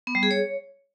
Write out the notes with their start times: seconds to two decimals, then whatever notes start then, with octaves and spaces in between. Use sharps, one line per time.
0.07 B3
0.15 G3
0.23 G#4
0.31 C#5